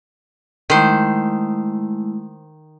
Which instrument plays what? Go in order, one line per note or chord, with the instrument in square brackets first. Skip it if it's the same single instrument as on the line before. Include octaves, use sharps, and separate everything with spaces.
[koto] D#3 C5 [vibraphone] G#3 A3 E4